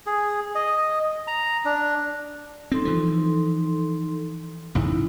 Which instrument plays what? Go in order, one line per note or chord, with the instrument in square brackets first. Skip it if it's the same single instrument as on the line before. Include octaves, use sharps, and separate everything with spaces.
[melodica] G#4
D#5
A#5
D4
[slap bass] C4 [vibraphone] D#4 A4 C6
[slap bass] E3 F3
[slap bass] A1 F2 C#3 [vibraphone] D#4 E4